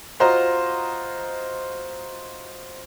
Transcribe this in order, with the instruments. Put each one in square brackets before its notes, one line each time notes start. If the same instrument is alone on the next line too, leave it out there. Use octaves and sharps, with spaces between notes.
[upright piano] F4 F#4 C5 D#5 A#5